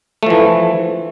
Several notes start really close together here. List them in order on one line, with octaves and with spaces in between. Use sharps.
A3 F3 E3